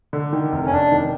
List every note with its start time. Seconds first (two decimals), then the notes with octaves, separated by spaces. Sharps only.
0.13 D3
0.33 D#3
0.52 F1
0.66 C#4
0.72 F1 D4
0.92 D#3